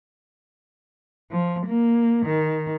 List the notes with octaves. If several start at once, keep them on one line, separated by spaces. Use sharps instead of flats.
F3
A#3
D#3